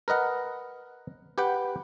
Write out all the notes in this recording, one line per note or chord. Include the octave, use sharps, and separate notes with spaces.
A#4 B4 D#5 F#5
G4 B4 F#5 G5